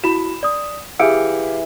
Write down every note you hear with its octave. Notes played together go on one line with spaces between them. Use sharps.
E4 F#4 B5 E7
D5 D#6
E3 G4 G#4 F5 E6 C#7 D7